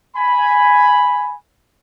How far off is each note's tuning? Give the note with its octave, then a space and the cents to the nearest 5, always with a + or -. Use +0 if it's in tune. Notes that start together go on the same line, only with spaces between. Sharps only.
G#5 +0 B5 +0